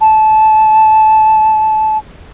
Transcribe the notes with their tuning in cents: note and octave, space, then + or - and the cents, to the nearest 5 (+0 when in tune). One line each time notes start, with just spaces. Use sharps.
A5 -20